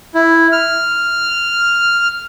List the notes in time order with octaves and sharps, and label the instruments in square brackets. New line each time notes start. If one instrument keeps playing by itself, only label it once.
[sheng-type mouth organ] E4
F6